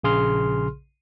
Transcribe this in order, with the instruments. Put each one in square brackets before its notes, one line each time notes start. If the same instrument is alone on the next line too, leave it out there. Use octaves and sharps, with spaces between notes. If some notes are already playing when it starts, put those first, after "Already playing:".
[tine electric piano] A#1 C#3 G#4 C6 F6